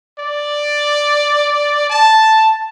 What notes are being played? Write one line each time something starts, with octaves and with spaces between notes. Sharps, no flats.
D5
A5